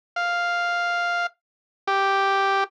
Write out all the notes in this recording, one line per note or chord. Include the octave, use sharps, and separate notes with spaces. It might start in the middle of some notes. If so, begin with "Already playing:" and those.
F5
G4